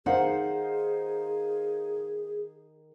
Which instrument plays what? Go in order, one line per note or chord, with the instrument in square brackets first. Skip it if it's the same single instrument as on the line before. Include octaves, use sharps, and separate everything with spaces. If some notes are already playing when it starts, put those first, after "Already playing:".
[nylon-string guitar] D#3 F#5 [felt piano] D#4 C5 F5 [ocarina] G#4